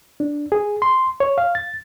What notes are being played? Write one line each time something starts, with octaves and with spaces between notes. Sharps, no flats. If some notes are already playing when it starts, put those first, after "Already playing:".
D4
G#4
C6
C#5
F5
A6